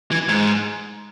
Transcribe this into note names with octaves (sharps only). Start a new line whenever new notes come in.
E3
G#2